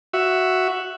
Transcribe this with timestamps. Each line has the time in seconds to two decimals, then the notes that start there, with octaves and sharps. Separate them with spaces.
0.13 F#4 E5